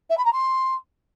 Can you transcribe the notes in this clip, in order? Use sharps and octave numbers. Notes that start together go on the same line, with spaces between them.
E5
B5
A#5
C6